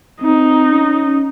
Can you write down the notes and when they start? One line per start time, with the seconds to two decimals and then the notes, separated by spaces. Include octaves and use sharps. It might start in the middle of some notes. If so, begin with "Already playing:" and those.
0.22 C4 D#4
0.72 C#4